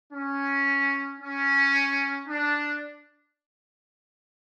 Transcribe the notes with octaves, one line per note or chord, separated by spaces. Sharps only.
C#4
C#4
D4